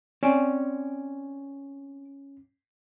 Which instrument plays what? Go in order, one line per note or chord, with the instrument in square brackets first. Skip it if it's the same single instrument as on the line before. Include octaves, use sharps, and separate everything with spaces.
[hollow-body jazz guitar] C4 D5 [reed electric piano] C#4